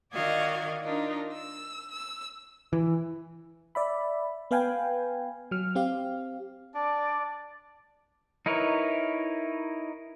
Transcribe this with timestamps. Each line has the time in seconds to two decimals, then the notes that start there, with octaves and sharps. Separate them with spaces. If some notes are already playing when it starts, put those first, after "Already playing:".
0.13 D#3 F#4 D5 D#5 F5 G#6
0.83 D4 D#4 F4 A#4
1.34 E6
1.92 E6
2.73 E3
3.75 D5 E5 B5
4.51 B3 B4 F5 G5 G#5
5.51 F#3 F6
5.75 C4 G4 F5
6.74 D4 D5
8.46 D#4 E4 A#4 B4 C#5